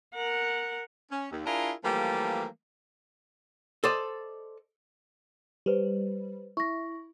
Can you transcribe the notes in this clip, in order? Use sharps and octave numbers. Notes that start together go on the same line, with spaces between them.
A#4 F#5
C#4
D#2
D4 E4 F4 G#4 A#4
E3 F3 G3 A3 A#3
A4 C5 D5 D#5
G3 G4 B4 C5
E4 C#6 A#6